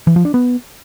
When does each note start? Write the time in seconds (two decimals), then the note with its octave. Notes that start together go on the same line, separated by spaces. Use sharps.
0.07 E3
0.16 F3
0.25 D4
0.34 B3